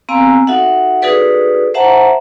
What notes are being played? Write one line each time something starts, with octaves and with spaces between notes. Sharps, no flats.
B3 C4 F5 G#5 A#5 E6
D#4 F#4 A4 E5 F#5
D#4 F#4 G#4 A4 B4 D5
C5 E5 F#5 A5 A#5